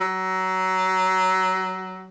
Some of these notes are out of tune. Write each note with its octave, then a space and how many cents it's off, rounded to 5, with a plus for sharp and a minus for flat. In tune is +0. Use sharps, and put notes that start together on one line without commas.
F#3 +20